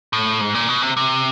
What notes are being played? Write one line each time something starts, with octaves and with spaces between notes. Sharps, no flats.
A2
G#2
A#2
B2
C3
C3